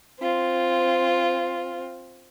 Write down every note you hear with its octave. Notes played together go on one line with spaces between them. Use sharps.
C4 F4